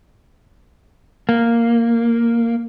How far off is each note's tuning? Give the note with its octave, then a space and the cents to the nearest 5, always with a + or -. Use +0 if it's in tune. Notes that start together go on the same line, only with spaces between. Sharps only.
A#3 -5